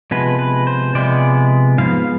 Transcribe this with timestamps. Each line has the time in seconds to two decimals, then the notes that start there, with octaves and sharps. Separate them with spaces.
0.11 C3 F3 G#3 B3 B4
0.39 B4
0.67 C5
0.95 C3 F3 G#3 B3 D5
1.78 G#2 F3 B3 F5